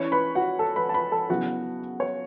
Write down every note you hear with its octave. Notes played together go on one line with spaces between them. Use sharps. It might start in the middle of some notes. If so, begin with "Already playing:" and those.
Already playing: E3 C#4 E4 C#5 C#6
B4 B5
F#4 F#5
A4 A5
B4 B5
A5
B4 B5
A4 A5
C#3 F#3 B3 E4 F#4 F#5
C#5